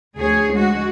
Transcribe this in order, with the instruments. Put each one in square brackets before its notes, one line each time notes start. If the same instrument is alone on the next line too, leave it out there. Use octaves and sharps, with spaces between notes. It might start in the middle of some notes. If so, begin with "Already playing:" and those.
[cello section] D2 G#4 C#5
G#3 F#4